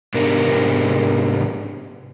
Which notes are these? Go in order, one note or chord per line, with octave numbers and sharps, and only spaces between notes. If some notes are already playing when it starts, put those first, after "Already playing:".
G#2 C3 B3 D4 G4 A#4